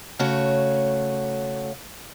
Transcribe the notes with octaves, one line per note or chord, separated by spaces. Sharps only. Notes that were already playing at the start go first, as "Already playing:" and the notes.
C#3 A3 F#4 C#5